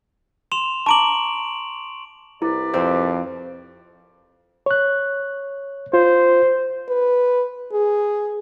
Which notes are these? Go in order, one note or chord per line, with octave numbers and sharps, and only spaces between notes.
C6 E7 F7
A5 A#5 C#6 D6 D7 F#7
C2 E4 B4 D5
F2 C4
C#5 F#6
F4 C5
B4
G#4